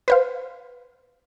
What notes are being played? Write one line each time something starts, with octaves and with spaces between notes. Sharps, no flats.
B4 C5 F5